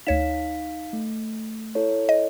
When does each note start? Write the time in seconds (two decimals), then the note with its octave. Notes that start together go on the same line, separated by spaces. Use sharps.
0.07 D2 D#4 C#5 F5 B6 E7
0.93 A3
1.75 E4 A4 C#5
2.09 D#5